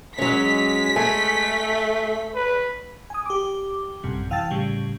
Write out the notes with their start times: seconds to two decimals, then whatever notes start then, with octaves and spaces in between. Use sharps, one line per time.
0.18 F#3 G#3 C#4 B6
0.96 A3 G#5
2.35 B4
3.10 G#5 D#6
3.26 G4 D6
4.03 A1 F#2 C3 G3
4.31 E3 F5 G5 A5 E6 A6
4.51 A2 C#3 G3